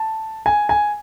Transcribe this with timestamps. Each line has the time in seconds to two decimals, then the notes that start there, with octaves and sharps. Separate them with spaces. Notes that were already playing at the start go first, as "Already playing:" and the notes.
Already playing: A5
0.46 G#5
0.69 G#5